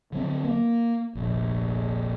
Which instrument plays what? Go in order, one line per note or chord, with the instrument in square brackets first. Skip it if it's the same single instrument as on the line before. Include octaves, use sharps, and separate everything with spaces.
[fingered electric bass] D3 F#3 C4
A#3
F1 A#1